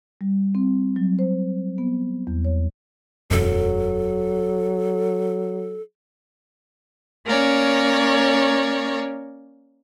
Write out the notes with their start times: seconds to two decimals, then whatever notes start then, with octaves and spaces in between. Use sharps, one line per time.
0.21 G3
0.55 C4
0.96 F#3
1.19 C5
1.78 B3
2.27 E2
2.45 C#5
3.31 E1 F#2 F#3 A4
7.25 A#3 C#4 A#4 C#5 D5